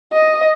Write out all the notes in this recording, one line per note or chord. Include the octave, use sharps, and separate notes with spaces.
D#5